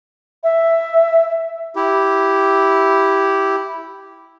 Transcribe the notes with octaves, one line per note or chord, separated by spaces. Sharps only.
E5
E4 G4